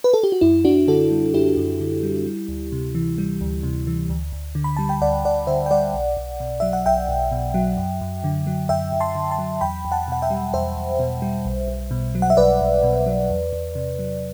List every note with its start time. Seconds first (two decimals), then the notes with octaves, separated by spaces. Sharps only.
0.04 B4
0.14 A4
0.23 G4
0.32 F#4
0.41 F#2 E4
0.65 F#2 D4 F#4
0.87 D3 F#4 A4
1.11 G3
1.34 F#2 E4 G4
1.57 F#2
1.80 D3
2.03 G3
2.26 G3
2.48 D2
2.72 C3
2.95 E3
3.18 G3
3.41 D2
3.63 C3
3.87 E3
4.10 D2
4.32 D2
4.55 D3
4.64 B5
4.77 G3 A5
4.89 G5
5.01 D2 D5 F#5
5.24 D2 D5 F#5
5.47 D3 C5 E5
5.66 G5
5.71 G3 D5 F#5
5.94 B1
6.17 B1
6.40 B2
6.60 F#3 E5
6.73 F#5
6.86 B1 E5 G5
7.08 B1
7.31 B2
7.54 F#3
7.77 F#2
8.01 F#2
8.24 D3
8.47 F#3
8.69 F#2 E5 G5
8.92 F#2
9.00 A5 C6
9.15 D3
9.31 A5 C6
9.38 F#3
9.61 E2 G5 B5
9.85 E2
9.92 F#5 A5
10.08 B2 F#5
10.22 E5 G5
10.30 G3
10.53 E2 C5 E5
10.77 E2
10.99 B2
11.22 G3
11.45 B1
11.68 B1
11.91 B2
12.15 F#3
12.22 F#5
12.30 E5
12.37 B1 B4 D5
12.61 B1
12.83 B2
13.06 F#3
13.29 E2
13.53 E2
13.75 C3
13.99 F#3